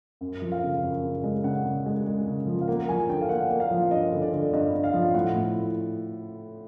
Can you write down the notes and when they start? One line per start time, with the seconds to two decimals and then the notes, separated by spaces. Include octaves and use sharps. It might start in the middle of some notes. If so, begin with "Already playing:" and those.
0.21 F#2
0.42 F3
0.52 F5
0.63 C#3
0.83 F#2
1.04 C#3
1.24 G#3
1.44 C#3 F#5
1.65 C#3
1.86 G#3
2.06 G#3
2.26 C#3
2.47 F3
2.61 F5
2.68 A#3 F#5
2.89 F3 G#5
3.09 D3 G5
3.21 F5
3.29 A#3 F#5
3.50 A#3
3.60 F5
3.71 F3
3.91 G2 D#5
4.12 D3
4.22 D5
4.33 D3
4.53 G2 D#5
4.74 G2
4.84 F5
4.94 F3
5.14 A2 F#5
5.36 A2